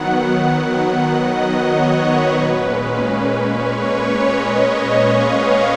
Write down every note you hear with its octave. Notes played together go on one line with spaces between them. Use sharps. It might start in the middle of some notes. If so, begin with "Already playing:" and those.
Already playing: D#3 F#3 B3 F#5
F#5
D#5
C#5
B4
A#2 G#3 C#4
C#5
B4
D#5
C#5
C#5
F5
F#5